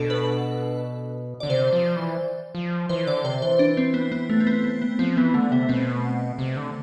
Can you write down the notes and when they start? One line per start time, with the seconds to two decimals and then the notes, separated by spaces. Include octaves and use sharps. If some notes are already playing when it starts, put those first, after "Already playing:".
Already playing: B2 D4 A4
0.10 B4
1.40 D3 D5
1.49 C3 C5
1.73 F3
1.96 E3
2.55 F3
2.89 E3 C5
3.07 D3 D5
3.24 C3 C5
3.42 E3 C5
3.59 D4
3.77 C4
3.94 B3
4.12 B3
4.30 A3
4.40 C4
4.47 B3
4.64 B3
4.82 B3
4.99 F3 C4
5.17 E3 B3
5.34 D3 A3
5.51 C3 B3
5.69 B2 C4
6.39 C3
6.57 D3